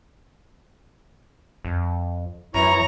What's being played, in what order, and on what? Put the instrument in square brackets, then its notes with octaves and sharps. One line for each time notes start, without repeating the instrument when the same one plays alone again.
[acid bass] F2
[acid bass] F#2 [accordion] E3 E4 [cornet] C#5 [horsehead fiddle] A#5